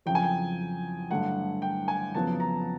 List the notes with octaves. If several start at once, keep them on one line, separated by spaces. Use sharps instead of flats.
F2 C#3 F#3 G5
G#5
G5
G2 D3 F#3 A3 F#5
G5
G#5
F2 C#3 F#3 B3 A5
A#5